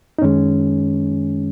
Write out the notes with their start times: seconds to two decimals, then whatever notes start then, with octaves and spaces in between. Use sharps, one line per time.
0.18 D#4
0.22 F#2 D#3 G#3 C#4